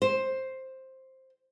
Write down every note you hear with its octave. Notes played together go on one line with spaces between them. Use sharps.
C5